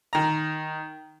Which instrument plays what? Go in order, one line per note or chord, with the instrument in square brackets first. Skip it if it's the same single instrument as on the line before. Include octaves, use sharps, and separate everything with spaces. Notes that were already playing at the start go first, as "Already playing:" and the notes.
[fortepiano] D#3 A#5